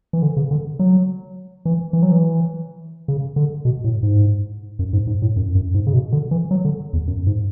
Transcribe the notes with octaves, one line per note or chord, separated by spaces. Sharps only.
E3
D3
C#3
D3
F#3
E3
E3
F#3
E3
C#3
D3
B2
A2
G#2
F#2
G#2
G#2
A2
F#2
F#2
G#2
C#3
B2
D3
E3
F#3
D3
E2
F#2
G#2